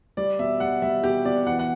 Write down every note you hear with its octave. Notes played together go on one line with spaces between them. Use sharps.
G3 D5
B2 E5
G3 F#5
G3 E5
B2 G4
B2 D5
E3 F#5
F#5